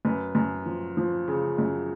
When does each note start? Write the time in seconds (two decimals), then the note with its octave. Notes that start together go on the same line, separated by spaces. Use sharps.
0.05 F#2 B4
0.35 F#2
0.66 F3
0.97 F3
1.28 C#3
1.58 F#2